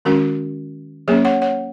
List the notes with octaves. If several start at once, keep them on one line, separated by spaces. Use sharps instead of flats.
D#3 G#3 C#4 F#4 A#4
F#3 A#3 C#4 G#4 C#5
C#5 F#5
C#5 F#5